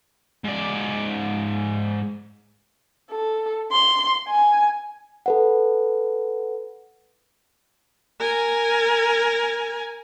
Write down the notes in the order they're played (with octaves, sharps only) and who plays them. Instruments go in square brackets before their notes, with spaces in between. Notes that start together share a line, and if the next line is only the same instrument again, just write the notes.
[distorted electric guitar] G#2 D5
[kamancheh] A4
C6
G#5
[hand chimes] A4 B4 F#5
[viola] A#4 G#5